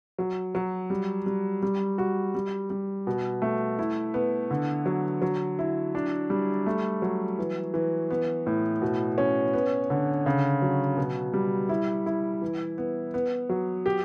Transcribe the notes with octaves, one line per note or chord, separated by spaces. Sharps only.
F#3
F#3
G3
G3
G3
F#4
G3
G3
B2
A3
E4
B3
D3
F#3
F#3
E4
D4
G3
A3
F#3
E3
E3
B3
A2
B2
C#4
B3
D3
C#3
F#3
B2
G3
E4
E4
E3
B3
B3
F#3
G4